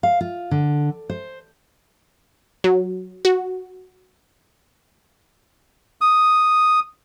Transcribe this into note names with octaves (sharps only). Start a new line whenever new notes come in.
F5
F4
D3
C5
F#3
F#4
D#6